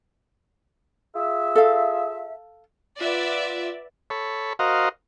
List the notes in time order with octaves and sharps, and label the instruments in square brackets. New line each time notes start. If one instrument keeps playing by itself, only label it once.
[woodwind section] F4 G#4 E5
[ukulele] A4 F5
[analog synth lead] F4 [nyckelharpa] B4 F#5 [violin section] D5 E5
[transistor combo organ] A4 C#5 B5
F#4 A#4 C5 D#5 F5